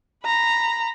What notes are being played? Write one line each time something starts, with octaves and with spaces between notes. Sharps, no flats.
A#5 B5